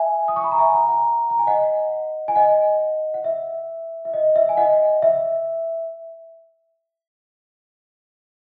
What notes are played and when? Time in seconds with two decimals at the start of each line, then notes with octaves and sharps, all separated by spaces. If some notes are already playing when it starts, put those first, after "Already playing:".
Already playing: E5 G#5
0.28 D#6
0.36 C#6
0.44 B5
0.51 A#5
0.59 E5 G#5
0.74 F#5 A#5
0.89 F#5 A#5
1.30 A#5
1.39 G#5
1.47 D#5 F#5
2.28 G#5
2.36 D#5 F#5
3.14 F#5
3.24 E5
4.05 E5
4.14 D#5
4.36 E5
4.49 G#5
4.57 D#5 F#5
5.02 E5